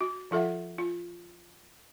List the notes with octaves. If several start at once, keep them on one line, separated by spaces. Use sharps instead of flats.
F#4
F3 F4 A4 E5 F#5
F4